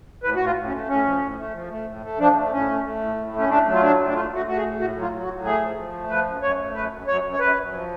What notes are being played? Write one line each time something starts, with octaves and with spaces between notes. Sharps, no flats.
A2 B4
A2 F#4
F4
A2
C#4
A3
A2 C#4
F3
A2
A3
F3
A3
A2
A3
F3 D4
A3
A2 C#4
A3
A3
A2
A2
A3
C#4
A3 D4
F#3
F4
A2 D4
A3
D4
A3 F4
A3 F#4
A3 F#4
G#4
A2
A2 F#4
F#3
F4
F#3
F#4
A2
A3 G#4
F3
F3
A3
F3 B4
F#2
F#2 C#5
A3
F#2 B4
F#2
F#2 C#5
F#2
C#5
F#2 B4
F#2
F3